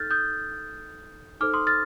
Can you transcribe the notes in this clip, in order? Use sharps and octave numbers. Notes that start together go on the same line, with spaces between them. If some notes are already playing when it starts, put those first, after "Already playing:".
Already playing: D#4 A4 F6 G6 A6
D#6 G6
D#4 A4 C5 D6 F6
C6 D#6
F6 A6